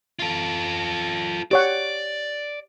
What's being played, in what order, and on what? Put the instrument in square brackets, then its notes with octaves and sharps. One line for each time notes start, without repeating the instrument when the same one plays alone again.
[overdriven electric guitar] F4 A4
[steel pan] G4 C#5 F#5 [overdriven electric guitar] D5